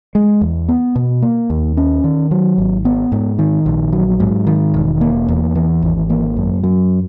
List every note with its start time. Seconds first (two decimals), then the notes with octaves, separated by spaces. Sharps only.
0.15 G#3
0.41 E2
0.68 B3
0.96 B2
1.22 A#3
1.50 D#2
1.77 C#4
2.04 D#3
2.31 F#3
2.58 G#1
2.85 B3
3.12 G#2
3.39 D#3
3.66 A#1
3.93 F#3
4.20 G#2
4.47 D#3
4.74 E1
5.01 A#3
5.28 E2
5.55 E3
5.82 G#1
6.10 A#3
6.37 F#2
6.63 F#3